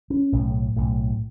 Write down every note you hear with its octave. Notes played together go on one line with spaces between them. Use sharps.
C#4
B1 A2
B1 A2